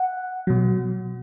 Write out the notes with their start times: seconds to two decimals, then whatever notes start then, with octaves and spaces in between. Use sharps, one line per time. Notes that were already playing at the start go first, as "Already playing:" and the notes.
Already playing: F#5
0.47 B2 F#3